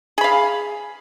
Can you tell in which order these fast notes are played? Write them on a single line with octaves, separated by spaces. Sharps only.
G#4 B5 F5